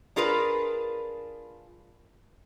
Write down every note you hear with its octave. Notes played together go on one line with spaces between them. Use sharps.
D4 F4 G#4 A#4 B4